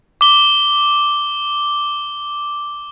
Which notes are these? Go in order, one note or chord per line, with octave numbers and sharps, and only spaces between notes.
D6 G7